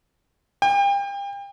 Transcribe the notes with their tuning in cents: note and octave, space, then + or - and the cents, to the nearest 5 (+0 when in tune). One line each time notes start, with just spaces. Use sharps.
G5 +35